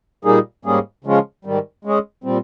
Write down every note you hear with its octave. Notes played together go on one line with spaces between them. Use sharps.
A#2 G3 A#3 D#4 G#4
G#2 G3 A#3 C#4 G#4
C#3 F3 G#3 C#4 F4
G#2 D#3 G3
G#3 C#4 G#4
A#2 G3 C4